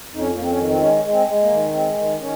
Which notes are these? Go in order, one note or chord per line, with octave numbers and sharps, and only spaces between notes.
F2 D#4
C#4
F2 A#3
C4
C#4
D#3
C4
G#3 C#4
G#3
C4
G#3
A#3
D#3
G#3 C4
D#3
D#3 C#4